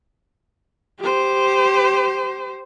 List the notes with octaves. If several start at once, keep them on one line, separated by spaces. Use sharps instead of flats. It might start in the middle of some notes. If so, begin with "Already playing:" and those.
G4 C5